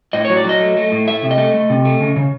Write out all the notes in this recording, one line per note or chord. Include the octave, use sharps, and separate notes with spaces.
A2 D#5
C#5
F#3
D5
F#3
D#5
A3
A3
A2
A3 E5
C3
D#5
A3
A3
C3
A3
C#3
C#3